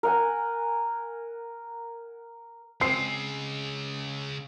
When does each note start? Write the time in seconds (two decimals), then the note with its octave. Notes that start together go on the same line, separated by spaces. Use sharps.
0.03 A#4 F#5 G#5
2.81 C#3 G#3 C4 C7